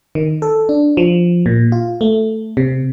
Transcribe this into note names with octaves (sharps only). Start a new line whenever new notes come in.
D#3
A4
D4
F3
A#2
F4
A3
C3